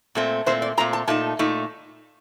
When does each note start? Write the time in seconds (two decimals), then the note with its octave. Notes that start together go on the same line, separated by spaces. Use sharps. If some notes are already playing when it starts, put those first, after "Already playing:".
0.15 A#2 A3 C4
0.46 A#2 A3 C4 C5
0.62 D5
0.77 A#2 A3 C4 A#5
0.93 A5
1.07 A#2 A3 D#4 A5
1.39 A#2 A3 D#4